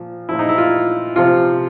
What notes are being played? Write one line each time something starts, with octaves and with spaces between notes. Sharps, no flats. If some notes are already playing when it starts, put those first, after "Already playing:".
Already playing: A#2 F3
A#2 F3 E4
D#4
E4
F4
C3 F3 F4